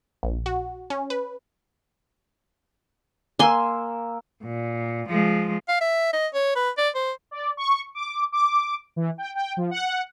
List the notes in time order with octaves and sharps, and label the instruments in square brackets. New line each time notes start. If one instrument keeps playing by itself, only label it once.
[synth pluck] A#1
F#4
C#4
B4
[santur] A#3 E6 [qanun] G#5 C6
[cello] A#2
F3 G#3
[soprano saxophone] F5
E5
D#5
C#5
B4
D5
C5
[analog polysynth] D5
C#6
D6
D6
E3
G5
G5
F3
F#5